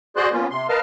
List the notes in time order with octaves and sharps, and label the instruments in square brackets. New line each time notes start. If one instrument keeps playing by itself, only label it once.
[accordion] F#4 G#4 C5 D5 C6 F#6
F3 A#3 B3 C#4 F4
C3 C6
A#4 B4 D#5 F5 A5 F6